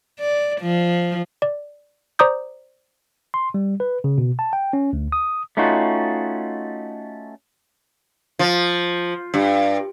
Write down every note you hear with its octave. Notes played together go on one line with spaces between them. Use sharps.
D5
F3
D5
C5 D5 A#5 D6 D#6 G6
C6
G3
B4
C#3
B2
A5
G5
C#4
D2
D#6
A3 C#4 D#4 F4 F#4
F3
G2